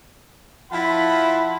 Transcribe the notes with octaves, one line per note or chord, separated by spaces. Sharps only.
F3 E4 F4 F#5 A5 B5